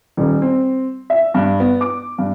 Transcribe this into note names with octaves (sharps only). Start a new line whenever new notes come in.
D#1
C4
E5
G2
B3
D6
G2